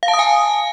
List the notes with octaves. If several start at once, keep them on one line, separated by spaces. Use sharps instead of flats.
F5
A5
D#6
G#5